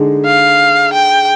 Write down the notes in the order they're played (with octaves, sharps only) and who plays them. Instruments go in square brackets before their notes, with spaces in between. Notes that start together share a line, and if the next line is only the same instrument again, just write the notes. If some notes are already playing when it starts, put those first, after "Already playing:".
Already playing: [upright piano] D3 G#3 D#4 G#4
[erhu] F5
G5